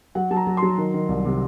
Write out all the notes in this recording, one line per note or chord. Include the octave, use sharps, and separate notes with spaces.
F#3 F#5
F#3 A5
A#5
F#3
C6
F#3
D#3
D#3
C2
C3